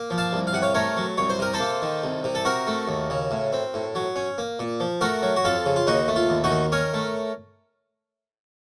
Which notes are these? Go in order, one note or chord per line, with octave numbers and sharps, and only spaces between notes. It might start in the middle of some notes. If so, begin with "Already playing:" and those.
Already playing: A#3
F3
F5 A5
C2
F5
C3 F#5
C#5 F5
A3 A#4 C#5
F#3
C2 C#5
C5
C3 A#4
A4 C5
A#3
D#3
C2
C3
A4
C4 F#4 A#4
A3
D#2
C#3
A2
C4
A2
F#3
C#4
A#3
A#2
F3
A3 F#4 A#4
F#3
F#4
F2 F4 A4
C#3
F4
D#2 D#4 F#4
A3
F4
D#2
D#4 F#4
D#3
C#4 A#4 C#5
A3